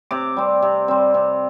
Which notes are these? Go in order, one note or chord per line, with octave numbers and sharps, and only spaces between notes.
C3 D6
G3 C4
C3
G3 C4
C3